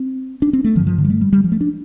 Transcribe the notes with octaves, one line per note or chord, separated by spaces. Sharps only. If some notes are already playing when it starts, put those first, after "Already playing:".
Already playing: C4
D4
C4
A3
G2 D3 F3
F3
D3
G3
A3
G3
G3
F3
A3
D4